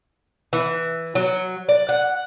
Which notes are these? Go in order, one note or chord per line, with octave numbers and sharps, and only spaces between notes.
E3
F#3
D5
F#5